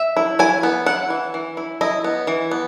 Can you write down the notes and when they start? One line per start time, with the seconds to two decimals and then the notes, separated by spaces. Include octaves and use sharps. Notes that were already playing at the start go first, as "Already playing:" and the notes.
Already playing: E5
0.17 E4
0.39 E4 G#5
0.63 B3
0.86 E4 F#5
1.10 E3
1.34 E3
1.57 E4
1.81 E4 D#5
2.04 B3
2.27 E3
2.51 B3